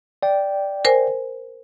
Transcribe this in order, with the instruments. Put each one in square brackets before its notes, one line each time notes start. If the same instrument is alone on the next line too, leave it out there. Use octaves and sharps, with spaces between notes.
[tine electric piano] D5 G5
[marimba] A#4 C5 G#5